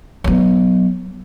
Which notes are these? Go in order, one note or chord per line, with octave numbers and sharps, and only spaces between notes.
F#3 B3